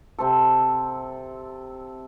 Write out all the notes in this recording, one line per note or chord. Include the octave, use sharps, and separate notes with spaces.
C3 C4 A4